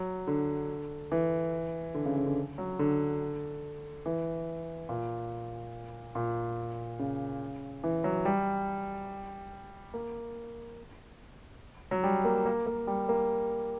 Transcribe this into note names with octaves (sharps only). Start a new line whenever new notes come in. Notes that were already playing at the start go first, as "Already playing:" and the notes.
Already playing: F#3
D3
E3
D3
C#3
C#3
D3
F#3
D3
E3
A#2
A#2
C#3
E3
F#3
G3
A#3
F#3
G3
A#3
A#3
A#3
G3
A#3